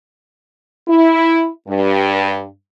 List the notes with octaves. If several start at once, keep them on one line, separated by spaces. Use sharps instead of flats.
E4
G2